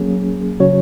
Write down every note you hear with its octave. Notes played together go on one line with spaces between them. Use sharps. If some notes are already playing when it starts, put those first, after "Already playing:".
Already playing: F#3 A#3 C#4 G#4
C#3 F#3 C#4 F#4 C#5